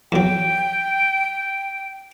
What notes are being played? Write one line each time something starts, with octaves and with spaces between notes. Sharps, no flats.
E2 F#3 G5